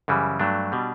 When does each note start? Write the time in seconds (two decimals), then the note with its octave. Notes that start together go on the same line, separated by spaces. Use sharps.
0.08 F#2 C#3 E3 G3
0.40 G2 F#3 A3 D4
0.72 B2 G3